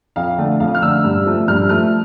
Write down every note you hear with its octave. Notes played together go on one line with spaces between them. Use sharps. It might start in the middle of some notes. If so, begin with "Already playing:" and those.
F2 F5
D3 A3
F2 F5
F6
D3 A3 E6
G2
F3 A3
G2 F6
F3 A3 F6